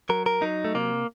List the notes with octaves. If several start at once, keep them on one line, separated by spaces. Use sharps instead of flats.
F#3 A#4
A#4
F#3 D#4
A3
C3 A#3